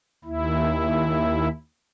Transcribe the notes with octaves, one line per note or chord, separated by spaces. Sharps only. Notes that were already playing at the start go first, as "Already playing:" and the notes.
D#2 E4